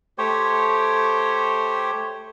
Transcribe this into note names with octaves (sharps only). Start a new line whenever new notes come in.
A3 G4 C5 C#5